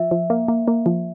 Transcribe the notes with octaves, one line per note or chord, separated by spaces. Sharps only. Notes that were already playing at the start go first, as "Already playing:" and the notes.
Already playing: F3 E5
F3
A#3
A#3
A#3
F3